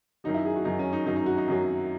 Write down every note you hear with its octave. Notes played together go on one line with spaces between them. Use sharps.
F#2 D#3 F#3 D#4
E4
G#4
F#4
F#2 D#3 F#3 D#4
C#4
D#4
F#2 D#3 F#3 D#4
D#4
F#4
D#4
F#2 D#3 F#3